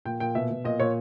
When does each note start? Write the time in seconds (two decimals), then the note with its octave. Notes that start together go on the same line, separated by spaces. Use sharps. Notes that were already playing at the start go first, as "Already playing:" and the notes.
0.05 A#2 G5
0.20 A#2 G5
0.35 B2 E5
0.50 B2
0.65 A#2 D#5
0.80 A#2 C#5